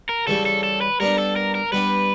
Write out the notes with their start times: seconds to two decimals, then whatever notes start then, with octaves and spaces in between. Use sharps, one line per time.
0.09 A#4
0.27 C#3 E3 G3 A4
0.46 A4
0.64 A4
0.81 B4
1.00 G3 B3 D4 A#4
1.18 A4
1.36 A#4
1.55 A#4
1.72 G3 B3 D4 B4